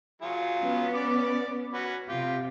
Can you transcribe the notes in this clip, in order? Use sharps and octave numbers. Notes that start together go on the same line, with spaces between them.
F#3 F4 G#4
B3 C#4
D5 D6
C#4 F#4 B4
C3 F4 G4